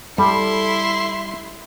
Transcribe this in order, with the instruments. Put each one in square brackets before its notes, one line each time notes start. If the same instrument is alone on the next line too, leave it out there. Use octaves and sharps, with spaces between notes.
[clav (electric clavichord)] G3 [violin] E4 C6 [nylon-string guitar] A4